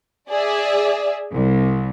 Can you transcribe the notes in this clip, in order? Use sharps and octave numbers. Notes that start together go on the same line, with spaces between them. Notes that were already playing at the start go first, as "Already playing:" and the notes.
G#4 D5 E5
C2